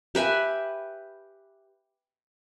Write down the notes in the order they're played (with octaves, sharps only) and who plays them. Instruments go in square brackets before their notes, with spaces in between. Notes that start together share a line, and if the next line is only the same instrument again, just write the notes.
[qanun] G4 B4 E5 G#5